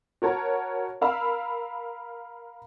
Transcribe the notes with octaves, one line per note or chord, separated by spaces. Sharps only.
F#4 A#4 C#5 A5
A#4 F5 B5 E6